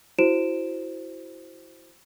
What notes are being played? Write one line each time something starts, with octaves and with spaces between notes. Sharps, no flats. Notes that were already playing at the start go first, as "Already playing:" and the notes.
E4 F#4 C5 D7 E7